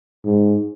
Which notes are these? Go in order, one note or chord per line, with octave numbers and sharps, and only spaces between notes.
G#2